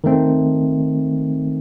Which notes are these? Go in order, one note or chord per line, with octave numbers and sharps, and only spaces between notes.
D#3 A3 C4